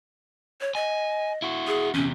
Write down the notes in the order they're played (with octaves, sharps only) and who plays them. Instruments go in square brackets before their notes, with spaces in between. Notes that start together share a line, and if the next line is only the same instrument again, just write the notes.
[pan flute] C#5
[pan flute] D#5 [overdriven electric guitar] G#5
[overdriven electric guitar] E4 F#4
[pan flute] G#4
[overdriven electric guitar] E2 C3 [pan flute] C#4